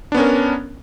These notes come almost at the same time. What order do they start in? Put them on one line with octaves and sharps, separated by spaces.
D4 B3 C#4 A#4